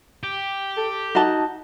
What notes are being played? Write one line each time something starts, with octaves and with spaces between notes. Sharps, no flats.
G4
A4
D#4 F#4 A5